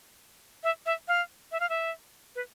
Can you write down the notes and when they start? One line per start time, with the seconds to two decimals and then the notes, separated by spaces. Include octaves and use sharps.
0.64 E5
0.86 E5
1.08 F5
1.52 E5
1.60 F5
1.69 E5
2.35 B4